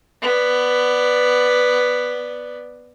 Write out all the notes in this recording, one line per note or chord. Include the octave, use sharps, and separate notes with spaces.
B3 D5